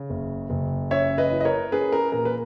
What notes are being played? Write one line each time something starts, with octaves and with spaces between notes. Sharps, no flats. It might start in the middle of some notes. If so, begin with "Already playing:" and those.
Already playing: C#3
F#1
F#1
C#4 C#5 E5
B4 D#5
E4
D#5
A#4 C#5
C#4 G#4 B4
A#4
A#2 A#4
B4